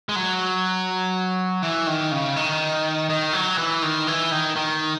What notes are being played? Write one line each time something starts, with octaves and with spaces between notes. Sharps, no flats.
G#3
F#3
E3
D#3
C#3
D#3
D#3
F#3
E3
D#3
E3
D#3
D#3